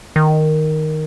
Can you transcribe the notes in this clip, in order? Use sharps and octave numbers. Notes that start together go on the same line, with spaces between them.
D#3